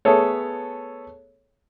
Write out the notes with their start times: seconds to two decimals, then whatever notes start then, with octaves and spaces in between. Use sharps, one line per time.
0.05 A3 B3 G#4 A4 C#5